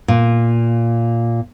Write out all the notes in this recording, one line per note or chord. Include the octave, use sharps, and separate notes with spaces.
A#2